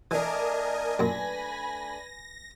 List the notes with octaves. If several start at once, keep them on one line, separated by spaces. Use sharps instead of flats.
E3 A3 D4 A#4 D#5 G#5
F#2 A#2 B4 G#5 B5 A#6